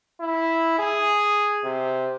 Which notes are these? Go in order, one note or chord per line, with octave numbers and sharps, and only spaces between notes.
E4
G#4
C3